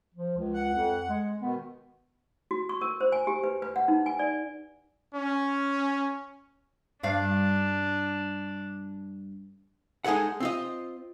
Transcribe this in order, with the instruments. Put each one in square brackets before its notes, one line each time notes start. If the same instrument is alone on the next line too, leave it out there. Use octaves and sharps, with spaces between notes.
[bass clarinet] F3
C#2
[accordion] F#5
[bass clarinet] F2
G#3
[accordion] B2 D#3 [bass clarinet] B3
[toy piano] F#4
C#6
A#4
C5
G#5
G4
B4
B4
F#5
D#4
G#5
D5
[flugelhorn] C#4
[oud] G2 D5 F5 [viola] D4
[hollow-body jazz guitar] G#3 D#4 G#4 A4 F#5
C4 F4 D#5